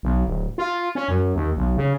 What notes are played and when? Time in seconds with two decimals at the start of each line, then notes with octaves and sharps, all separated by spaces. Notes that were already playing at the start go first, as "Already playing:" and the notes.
0.03 B1
0.27 D1
0.58 F4
0.95 C#4
1.08 F#2
1.35 D#2
1.57 B1
1.77 C#3